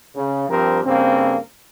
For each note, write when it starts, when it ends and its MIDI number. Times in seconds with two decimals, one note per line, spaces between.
0.15 0.46 49
0.49 0.80 43
0.49 0.80 53
0.49 0.80 60
0.49 0.80 67
0.49 0.80 70
0.85 1.37 43
0.85 1.37 49
0.85 1.37 58
0.85 1.37 60